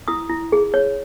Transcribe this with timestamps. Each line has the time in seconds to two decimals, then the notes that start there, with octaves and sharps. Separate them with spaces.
0.08 E4 D#6
0.30 E4
0.52 G#4
0.74 C#5